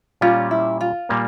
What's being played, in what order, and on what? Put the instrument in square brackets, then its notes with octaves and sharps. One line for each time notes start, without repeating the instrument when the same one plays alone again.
[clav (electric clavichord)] A#2 G3 C#4 [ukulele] F4
[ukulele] E4
F4
[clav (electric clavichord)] A#2 G3 A#3